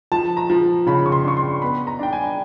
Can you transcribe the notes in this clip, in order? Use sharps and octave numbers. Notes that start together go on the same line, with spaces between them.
F3 A5
A#5
F3
C#3 B5
C#6
C6
D4 C#6
C6
B3 B5
A#5
D4 G5
G#5